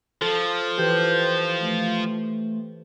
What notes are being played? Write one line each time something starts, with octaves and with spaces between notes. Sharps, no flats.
F3 A4
E3 G4 B4 C5 G6
A3